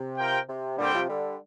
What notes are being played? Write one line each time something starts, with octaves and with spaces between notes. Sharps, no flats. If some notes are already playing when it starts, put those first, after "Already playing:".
Already playing: C3
F4 A#4 G5
C3
A#2 D3 G3 C4 G4 C5 G5
C3 F3
D3 G3